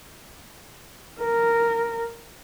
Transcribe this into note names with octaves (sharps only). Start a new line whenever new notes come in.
A#4